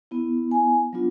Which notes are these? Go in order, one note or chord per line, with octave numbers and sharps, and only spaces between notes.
B3 E4
G#5
F#3 B3 D4 F4